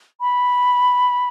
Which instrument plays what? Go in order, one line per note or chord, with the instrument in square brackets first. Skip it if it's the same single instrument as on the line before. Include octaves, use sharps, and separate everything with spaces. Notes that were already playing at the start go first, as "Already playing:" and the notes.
[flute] B5